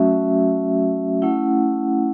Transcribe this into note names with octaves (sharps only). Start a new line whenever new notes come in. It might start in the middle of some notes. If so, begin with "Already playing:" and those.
Already playing: F#3 A3 C#4 F#4 E5
A3 C#4 E4 F#5